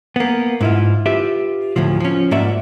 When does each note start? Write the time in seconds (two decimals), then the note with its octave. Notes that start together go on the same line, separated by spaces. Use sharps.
0.16 A#3 B3
0.61 G#2 E4 F4
1.06 F4 G4 B4 E5
1.76 D2 A2 D3 F3
2.00 F3 C#4
2.31 G#2 A#3 F4 F#4 D5 E5